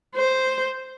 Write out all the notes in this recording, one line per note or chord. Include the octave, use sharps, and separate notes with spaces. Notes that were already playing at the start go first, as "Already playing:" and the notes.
C5